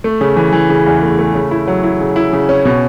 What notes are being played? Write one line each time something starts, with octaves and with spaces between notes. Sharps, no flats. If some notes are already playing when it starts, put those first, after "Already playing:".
A3
C#3
E3
E3
C#3
E2
A3
A3
C#3
E4
F#3
E4
C#3
E4
C#3
C#4
B2